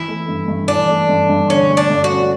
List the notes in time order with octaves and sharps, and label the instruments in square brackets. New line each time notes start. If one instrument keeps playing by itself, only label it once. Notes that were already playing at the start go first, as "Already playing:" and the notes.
Already playing: [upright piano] E3 [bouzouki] E4
[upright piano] A3
G2
G2
[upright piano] E3 [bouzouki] D4
[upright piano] A3
G2
G2
[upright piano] D3 [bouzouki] C#4
[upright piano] A3
[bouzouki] D4
[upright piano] G2
[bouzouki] F#4
[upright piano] C#4